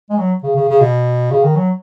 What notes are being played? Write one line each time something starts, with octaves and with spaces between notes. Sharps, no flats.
G#3
F#3
C#3
C#3
C#3
B2
C#3
D#3
F#3